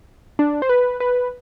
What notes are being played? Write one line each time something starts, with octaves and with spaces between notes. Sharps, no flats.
D4
C5
B4
B4